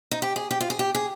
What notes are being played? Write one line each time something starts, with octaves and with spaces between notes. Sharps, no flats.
D#4
G4
G#4
G4
F4
G#4
G4
G#4